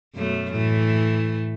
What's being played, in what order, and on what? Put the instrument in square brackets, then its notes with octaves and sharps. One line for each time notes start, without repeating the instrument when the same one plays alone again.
[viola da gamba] F#2 B2 A3
[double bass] A2 [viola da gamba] E3 A3